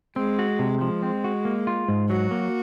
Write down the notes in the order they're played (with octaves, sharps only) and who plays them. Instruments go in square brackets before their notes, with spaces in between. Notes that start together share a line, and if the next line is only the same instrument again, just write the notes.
[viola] G#3 [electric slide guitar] C4
[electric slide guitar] F#4
C3
[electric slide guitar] F3 [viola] G#3
[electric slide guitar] C4
F#4
A#3
F4
G#2
[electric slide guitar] F#3 [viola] F#4
[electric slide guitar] A#3